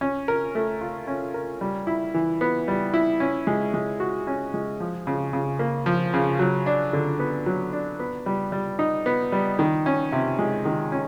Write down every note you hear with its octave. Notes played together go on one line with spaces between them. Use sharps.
C#4
A#4
A3
F4
C#4
A#4
G3
E4
E3
B3
G3
E4
C#4
G#3
G#3
F#4
C#4
G#3
F3
C#3
C#3
A#3
F3
C#3
F#3
D4
D3
B3
F#3
D4
B3
G3
G3
D#4
B3
G3
D#3
C#4
C3
G#3
D#3
C#4